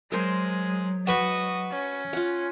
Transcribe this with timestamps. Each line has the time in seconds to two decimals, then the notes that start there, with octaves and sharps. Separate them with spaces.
0.12 F#3 G#3 A#4 C5
1.07 F#4 B4 D#5 C#6
1.72 C#4
2.13 F4 F#5